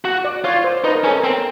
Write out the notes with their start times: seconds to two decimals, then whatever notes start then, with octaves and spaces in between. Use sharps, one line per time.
0.05 F#4 F#5
0.25 D5
0.44 F4 C#5
0.64 C5
0.84 D#4 B4
0.95 A#4
1.04 C#4
1.07 A4
1.19 A#4
1.24 C4